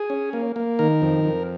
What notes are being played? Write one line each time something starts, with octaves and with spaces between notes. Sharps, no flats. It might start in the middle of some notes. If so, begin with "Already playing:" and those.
Already playing: G#4
C#4
A#3
A#3
D#3 A#4
F2
F2